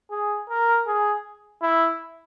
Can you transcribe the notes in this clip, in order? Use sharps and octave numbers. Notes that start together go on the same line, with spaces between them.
G#4
A#4
G#4
E4